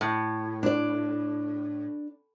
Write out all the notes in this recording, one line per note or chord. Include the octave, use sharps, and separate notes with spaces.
A2
D4 D5